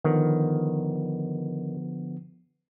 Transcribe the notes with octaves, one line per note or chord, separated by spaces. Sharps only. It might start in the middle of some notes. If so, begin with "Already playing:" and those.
D3 D#3 F3 B3